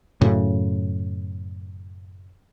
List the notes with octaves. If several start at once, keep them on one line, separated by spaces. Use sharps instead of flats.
F#2 A2 C#3